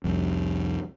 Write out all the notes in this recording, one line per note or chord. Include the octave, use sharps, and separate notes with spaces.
C2 F2